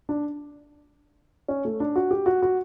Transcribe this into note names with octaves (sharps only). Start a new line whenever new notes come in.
D4
C#4
A3
D4
F#4
G4
F#4
F#4